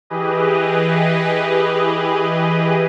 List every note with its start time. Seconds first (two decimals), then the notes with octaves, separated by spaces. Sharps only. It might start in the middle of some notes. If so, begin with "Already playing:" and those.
0.10 E3 G4 G#4 B4 D#5